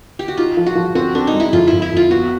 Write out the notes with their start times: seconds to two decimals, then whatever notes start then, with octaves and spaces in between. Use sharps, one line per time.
0.19 G4
0.28 F#4
0.37 D#4 F4
0.57 F3
0.66 F#4
0.75 F3
0.95 C4 F#4
1.15 C4 D4
1.27 D#4
1.33 G#3
1.40 E4
1.52 F2 F4
1.68 E4
1.73 F2
1.82 E4
1.92 F2 F4
2.10 B3 F#4